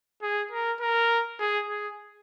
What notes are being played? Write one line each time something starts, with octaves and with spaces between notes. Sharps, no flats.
G#4
A#4
A#4
G#4
G#4